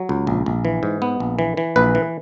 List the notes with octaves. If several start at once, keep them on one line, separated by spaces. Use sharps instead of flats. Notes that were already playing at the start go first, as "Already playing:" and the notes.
Already playing: F#3
C#2
A#1
A#1
E3
G#2
B3
A#1
E3
E3
A#1 B4
E3